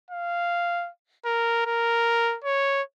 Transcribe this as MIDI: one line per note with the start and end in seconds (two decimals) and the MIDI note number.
0.11 0.90 77
1.25 1.62 70
1.66 2.37 70
2.45 2.82 73